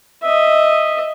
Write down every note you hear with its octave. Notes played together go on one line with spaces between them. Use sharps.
D#5 E5